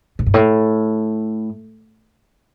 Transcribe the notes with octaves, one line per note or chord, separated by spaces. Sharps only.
A2
G2
A2